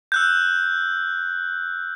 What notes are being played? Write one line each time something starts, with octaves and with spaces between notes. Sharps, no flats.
E6 F#6 G6